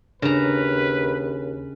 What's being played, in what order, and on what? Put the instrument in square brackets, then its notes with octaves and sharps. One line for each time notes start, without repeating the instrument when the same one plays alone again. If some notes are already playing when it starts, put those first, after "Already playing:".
[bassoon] D#2 [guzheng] C#3 A#5 [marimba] D4 [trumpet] B4